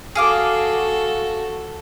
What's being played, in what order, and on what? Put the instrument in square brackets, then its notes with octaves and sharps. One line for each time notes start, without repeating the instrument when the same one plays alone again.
[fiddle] F#4 A4 [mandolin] G#4 F5 D6